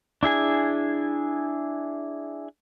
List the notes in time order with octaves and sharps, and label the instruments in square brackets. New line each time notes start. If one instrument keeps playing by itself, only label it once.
[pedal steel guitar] D4 E4 G#4 G#5